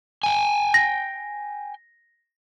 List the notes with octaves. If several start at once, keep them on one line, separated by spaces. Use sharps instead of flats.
G5 G#5
A#6